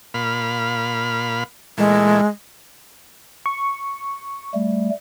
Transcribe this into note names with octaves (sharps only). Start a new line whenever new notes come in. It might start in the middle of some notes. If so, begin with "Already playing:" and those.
A#2 F5 B5
A#2 E3 G#3 A3
C#6
G3 A3